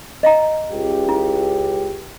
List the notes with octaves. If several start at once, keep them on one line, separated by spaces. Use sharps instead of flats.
D#5 F5 A#5
C#2 G4
E4